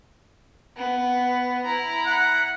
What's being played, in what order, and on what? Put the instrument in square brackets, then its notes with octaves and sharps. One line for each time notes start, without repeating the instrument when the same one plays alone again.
[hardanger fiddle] B3
E4 A#5
[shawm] F#5